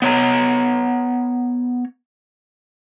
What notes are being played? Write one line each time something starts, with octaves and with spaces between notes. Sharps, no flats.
B3 C#5 A#5